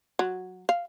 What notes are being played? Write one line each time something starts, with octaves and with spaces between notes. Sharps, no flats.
F#3
F5